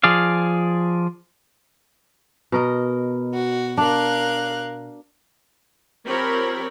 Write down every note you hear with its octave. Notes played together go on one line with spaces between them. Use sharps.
F3 G#4 D5 F5
B2 A#4 D#5
F#4
D4 A#4 F5 F#6
F3 C4 G4 A#4 C#5 B5